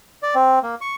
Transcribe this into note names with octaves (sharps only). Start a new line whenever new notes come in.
D5
C4
A#3
C#6